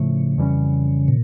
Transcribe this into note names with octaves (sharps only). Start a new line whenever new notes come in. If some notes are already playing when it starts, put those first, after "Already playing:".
Already playing: A2 C#3 F3 A3
F2 E3 G3 C#4
A#2